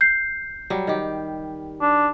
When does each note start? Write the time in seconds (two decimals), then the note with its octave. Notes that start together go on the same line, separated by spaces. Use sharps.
0.01 G6 C7
0.70 F#3 G3
0.87 D#3 G4
1.82 D4